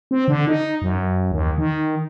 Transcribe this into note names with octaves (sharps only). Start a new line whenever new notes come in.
C4
D3
D#4
F#2
D#2
D#3